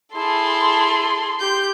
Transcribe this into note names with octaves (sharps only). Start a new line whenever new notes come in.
E4 G#4 A4 A5 C6
G4 G6